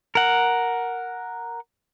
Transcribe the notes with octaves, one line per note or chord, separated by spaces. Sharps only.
A#4 F#5